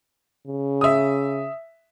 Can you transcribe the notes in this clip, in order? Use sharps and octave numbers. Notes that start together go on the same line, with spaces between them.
C#3
E5 D#6